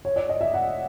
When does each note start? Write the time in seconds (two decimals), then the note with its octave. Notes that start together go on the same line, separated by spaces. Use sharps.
0.05 C#5
0.16 D5
0.29 D#5
0.41 E5
0.54 F#5